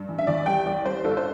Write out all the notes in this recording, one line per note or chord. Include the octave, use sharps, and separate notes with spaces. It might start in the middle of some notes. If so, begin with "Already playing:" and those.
Already playing: G2
E3
E5
E2 D5
G3 G5
C2 D5
G3 C5
G1 A4
C5